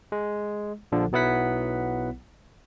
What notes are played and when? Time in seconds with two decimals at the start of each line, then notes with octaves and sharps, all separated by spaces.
0.12 G#3
0.92 A#1 D3 F3
1.12 B1 F#3 B3 E4 F#5 B6